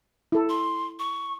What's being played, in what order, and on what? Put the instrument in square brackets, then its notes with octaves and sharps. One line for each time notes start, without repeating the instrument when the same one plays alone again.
[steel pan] E4 A4
[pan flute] C6
C#6